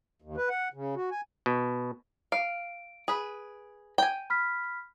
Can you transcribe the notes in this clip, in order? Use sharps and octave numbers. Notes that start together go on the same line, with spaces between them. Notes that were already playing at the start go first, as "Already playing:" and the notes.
D#2
B4
F#5
C#3
F#4
G#5
B2
F5 D7
G#4 B4
G5 G#5
B5 F6 B6